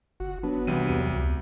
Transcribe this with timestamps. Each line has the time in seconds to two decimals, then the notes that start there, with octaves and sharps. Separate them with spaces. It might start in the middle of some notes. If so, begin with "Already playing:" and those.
0.20 G1 F#4
0.43 F#3 B3 D4
0.67 C2 E3 G3 D#7
0.90 E2
1.13 C#2